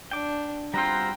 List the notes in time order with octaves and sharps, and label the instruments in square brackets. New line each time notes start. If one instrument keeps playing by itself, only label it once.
[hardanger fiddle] D4 [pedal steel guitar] G5 D6
[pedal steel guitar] G3 F#4 C6 [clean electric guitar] B3 C4 F4 [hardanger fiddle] G5 [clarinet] A#5